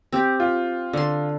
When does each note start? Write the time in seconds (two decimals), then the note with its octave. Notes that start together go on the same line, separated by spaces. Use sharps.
0.12 C4 G4
0.40 F4
0.93 D3 C6